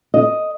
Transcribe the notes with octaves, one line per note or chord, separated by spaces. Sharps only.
D#5